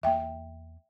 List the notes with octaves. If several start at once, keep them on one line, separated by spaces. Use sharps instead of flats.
E2 A#3 E5 G5